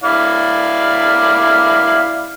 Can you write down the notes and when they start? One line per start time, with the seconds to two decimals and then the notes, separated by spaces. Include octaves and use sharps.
0.04 E4 D5 F5